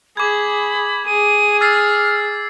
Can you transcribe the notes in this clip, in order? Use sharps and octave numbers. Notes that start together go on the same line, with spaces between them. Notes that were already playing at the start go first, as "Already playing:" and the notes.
G#4 B5 D6 G#6
G#4 D#7
E6 F6 A6 C7